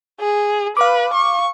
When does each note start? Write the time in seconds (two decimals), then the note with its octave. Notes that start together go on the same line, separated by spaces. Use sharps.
0.20 G#4
0.77 B4 F5 D6
1.14 C#6